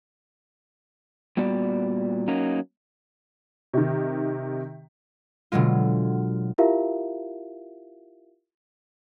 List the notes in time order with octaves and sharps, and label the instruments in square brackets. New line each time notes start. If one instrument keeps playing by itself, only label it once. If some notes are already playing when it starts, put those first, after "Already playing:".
[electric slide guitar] A#2 G3 B3 F#4 D5
F#3 A#3 C#4 D#4
[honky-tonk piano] C3 D#3
[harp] B2 D3 F#3 G#3 F4
[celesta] E4 F4 G4 A#4 E5 F5